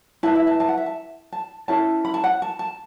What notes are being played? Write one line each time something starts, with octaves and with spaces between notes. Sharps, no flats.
E4 B4 A5
E5
A5
A5
F#5
E5
A5
A5
C#4 E4 A4 A5
B5
A5
F#5
A5
A5